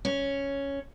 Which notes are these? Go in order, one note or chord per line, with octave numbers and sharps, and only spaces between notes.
C#4